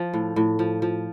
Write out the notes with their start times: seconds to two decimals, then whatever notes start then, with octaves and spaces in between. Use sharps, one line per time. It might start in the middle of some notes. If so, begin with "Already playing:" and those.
Already playing: F3
0.14 A2
0.36 A2
0.59 F3
0.82 F3